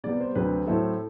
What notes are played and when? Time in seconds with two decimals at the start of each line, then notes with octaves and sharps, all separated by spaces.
0.04 C3 G3 B3 D5
0.21 C5
0.35 D2 C3 F#3 C4 B4
0.67 A2 F#3 C4 E4 A4